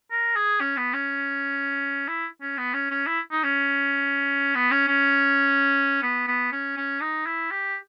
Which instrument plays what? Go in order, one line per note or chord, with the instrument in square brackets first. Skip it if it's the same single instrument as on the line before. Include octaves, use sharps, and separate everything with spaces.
[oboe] A#4
G#4
C#4
B3
C#4
E4
C#4
B3
C#4
C#4
E4
D#4
C#4
B3
C#4
C#4
B3
B3
C#4
C#4
D#4
E4
G4